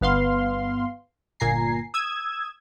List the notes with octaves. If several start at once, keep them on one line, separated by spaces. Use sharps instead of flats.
G1 B3 F5 C6
G1 A#2 G#5 A#5 C7
D#6 E6 G#6